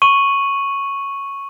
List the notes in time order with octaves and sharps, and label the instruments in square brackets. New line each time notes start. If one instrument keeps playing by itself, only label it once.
[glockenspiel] C#6 D#7 F#7